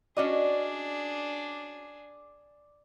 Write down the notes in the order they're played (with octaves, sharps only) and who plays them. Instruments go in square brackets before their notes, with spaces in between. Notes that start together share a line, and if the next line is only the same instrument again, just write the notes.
[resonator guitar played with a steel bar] C#4 F#4 D#5 [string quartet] D4 G#4 [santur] D5